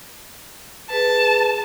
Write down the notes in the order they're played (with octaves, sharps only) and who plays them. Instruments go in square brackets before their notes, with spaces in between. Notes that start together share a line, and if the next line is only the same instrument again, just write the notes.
[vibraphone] G#4 B4 [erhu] A5